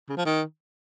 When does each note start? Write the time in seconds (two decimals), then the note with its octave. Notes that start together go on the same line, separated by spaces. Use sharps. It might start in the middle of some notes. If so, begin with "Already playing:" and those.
0.09 C#3
0.17 F3
0.26 D#3